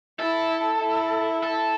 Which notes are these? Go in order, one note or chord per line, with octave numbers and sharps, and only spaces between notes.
E4 A4
E4
A4